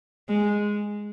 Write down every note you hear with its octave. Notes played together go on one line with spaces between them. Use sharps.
G#3